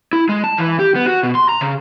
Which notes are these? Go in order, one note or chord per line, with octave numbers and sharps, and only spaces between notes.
E4
G#3
A5
E3
G4
B3
F#4
B2
C6
A#5
C#3